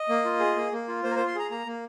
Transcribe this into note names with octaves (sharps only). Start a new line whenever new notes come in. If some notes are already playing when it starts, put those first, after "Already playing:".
Already playing: D#5
A#3
F4
G#4
A#3
A#3
F4
A#3 C5
A#4
F4 C5
C6
G#4 A#5
A#3 A#5
A#3